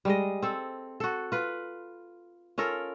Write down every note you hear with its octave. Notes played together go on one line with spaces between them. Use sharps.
G3 G#3 D#5
C4 A4
F#4 A4
F4 B4
C#4 F4 A4 A#4